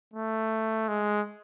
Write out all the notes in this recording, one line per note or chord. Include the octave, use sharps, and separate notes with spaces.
A3
G#3